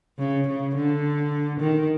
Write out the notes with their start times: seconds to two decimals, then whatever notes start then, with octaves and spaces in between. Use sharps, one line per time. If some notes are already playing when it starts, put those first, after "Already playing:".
0.18 C#3
0.48 C#3
0.75 D3
1.60 D#3